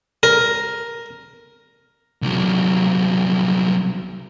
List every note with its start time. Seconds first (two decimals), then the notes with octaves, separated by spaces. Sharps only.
0.23 A#4
2.22 C2 F#3